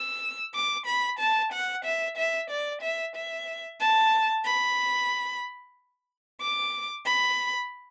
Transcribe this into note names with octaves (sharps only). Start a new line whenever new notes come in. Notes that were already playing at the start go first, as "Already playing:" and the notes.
Already playing: E6
D6
B5
A5
F#5
E5
E5
D5
E5
E5
A5
B5
D6
B5